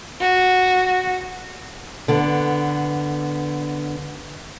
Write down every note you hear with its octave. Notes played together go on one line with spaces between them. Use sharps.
F#4
D3 B3